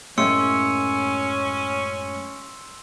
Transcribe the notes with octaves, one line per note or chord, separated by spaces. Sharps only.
F#2 A2 G#3 C#4 C6 E6 C#7